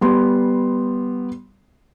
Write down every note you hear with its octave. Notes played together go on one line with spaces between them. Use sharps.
G3 B3 C6